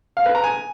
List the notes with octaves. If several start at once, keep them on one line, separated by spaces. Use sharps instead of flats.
F5
B4
A#5
G#5